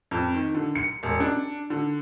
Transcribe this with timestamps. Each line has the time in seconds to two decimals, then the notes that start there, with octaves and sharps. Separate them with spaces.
0.11 F2
0.34 D#3
0.55 D3
0.75 C#7
1.03 E1
1.20 D4
1.70 D3